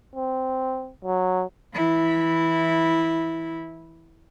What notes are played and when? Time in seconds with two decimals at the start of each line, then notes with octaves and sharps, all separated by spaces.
0.15 C4
1.05 F#3
1.74 E3 E4